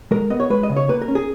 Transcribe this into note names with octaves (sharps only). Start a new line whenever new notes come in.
G#3 A#4
B3 D#5
C#5
G#3 B4
D#5
C#3
C#5
A#3 B4
A#4
C#4
G#4